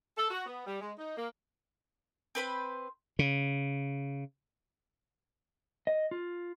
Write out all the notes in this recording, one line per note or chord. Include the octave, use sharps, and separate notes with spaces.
A4
F#4
B3
G3
G#3
D#4
A#3
C4 B4 C5 B5
C#3
D#5
F4